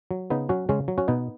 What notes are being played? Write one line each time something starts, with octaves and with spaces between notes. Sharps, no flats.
F#3
C#3 B3 D#4
F#3 C#4 F#4
C#3 G#3 C#4
F#3
C#4 F#4
B2 B3 D#4